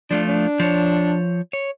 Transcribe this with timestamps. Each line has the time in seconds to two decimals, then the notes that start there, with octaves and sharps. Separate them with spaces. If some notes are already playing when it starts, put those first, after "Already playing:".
0.11 F3 A3 D4 F4
0.28 D4
0.60 F3 C#5
1.53 C#5